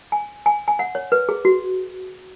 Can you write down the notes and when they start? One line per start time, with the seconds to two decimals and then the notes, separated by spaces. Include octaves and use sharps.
0.12 G#5
0.46 G#5
0.68 G#5
0.79 F#5
0.95 C#5
1.12 B4
1.29 G#4
1.45 F#4